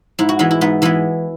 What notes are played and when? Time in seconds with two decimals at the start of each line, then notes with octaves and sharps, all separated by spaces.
0.19 G#2 E4
0.29 F#4
0.39 E3 G#3 B3 E4
0.51 E4
0.61 G#2 B3
0.82 E3 G#3 B3 E4